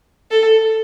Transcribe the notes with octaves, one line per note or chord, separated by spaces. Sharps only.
A4